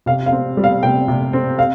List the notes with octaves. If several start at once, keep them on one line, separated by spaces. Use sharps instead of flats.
C3 F5
F5
C4
G3
F5
C3 G5
C3
C4
F5